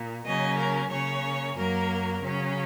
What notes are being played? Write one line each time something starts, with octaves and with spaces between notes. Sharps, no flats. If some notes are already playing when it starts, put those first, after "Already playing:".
Already playing: A#2
C#3 F#3 A#3 C#4 D#5
A#4
C#3 A#3 C#4 C#5
F#2 F#3 A#3 A#4
C#3 F#3 C#4